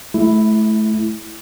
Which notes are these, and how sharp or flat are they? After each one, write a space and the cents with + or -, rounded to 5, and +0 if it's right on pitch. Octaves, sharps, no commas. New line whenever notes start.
A3 -30 E4 +0